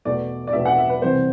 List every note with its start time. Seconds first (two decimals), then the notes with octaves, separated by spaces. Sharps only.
0.05 E2 B2 A3 D5
0.47 D5
0.53 E2 B2 A3 E5
0.65 F#5
0.78 E5
0.89 B4
1.02 C2 C3 E3 C5